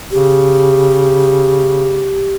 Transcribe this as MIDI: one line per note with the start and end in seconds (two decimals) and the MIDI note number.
0.11 2.23 49
0.11 2.36 67